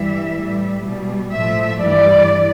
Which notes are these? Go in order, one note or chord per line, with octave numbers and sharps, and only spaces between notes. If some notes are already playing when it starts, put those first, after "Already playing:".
Already playing: G2 E3 G3 E5
A2 G3
B2 G3
A2 F3 A3 E5
G2 E3 G3 D5